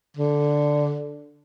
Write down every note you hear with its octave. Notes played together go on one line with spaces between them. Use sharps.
D3